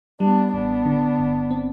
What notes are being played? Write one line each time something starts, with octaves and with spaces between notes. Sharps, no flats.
G3 B3 D4
A1 B3 D4
D3
G1
C4